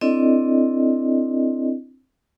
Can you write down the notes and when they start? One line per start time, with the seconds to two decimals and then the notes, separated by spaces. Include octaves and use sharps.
0.01 C4 D4 E4 A4 D5 D#5